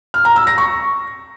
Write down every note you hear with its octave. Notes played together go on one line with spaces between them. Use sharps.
F6
A#5
E6
A#6
C#6